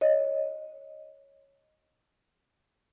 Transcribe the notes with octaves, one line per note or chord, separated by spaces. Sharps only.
C#5 D#5